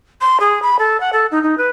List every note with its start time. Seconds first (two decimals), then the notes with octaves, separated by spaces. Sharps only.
0.21 C6
0.40 G#4
0.62 B5
0.79 A4
1.00 F#5
1.13 A4
1.31 D#4
1.43 D#4
1.57 B4